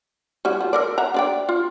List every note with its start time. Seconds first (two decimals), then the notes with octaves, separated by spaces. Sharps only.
0.45 G3 E4 F#4
0.61 F3
0.73 A4 A#4 D5
0.98 E5 F#5 A#5
1.14 D4 D5 G5
1.49 F4